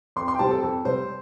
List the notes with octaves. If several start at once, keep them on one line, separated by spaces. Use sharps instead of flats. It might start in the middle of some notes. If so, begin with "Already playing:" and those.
F2 C6
C6
G5
C3 G3 C4 A5
A4
F2 A4
C3 G3 C4 C5